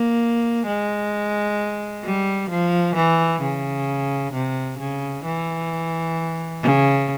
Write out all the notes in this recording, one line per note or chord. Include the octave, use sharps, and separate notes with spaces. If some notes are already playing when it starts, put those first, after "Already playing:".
Already playing: A#3
G#3
G3
F3
E3
C#3
C3
C#3
E3
C#3